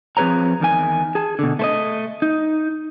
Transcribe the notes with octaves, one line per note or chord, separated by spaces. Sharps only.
F3 C4 G#4 B4 C#5 A#5
E2 D#3 G#5
G#4 A5
B2 D3
A3 C5 D#5
D#4